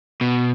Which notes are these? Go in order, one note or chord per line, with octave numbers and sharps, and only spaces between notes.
B2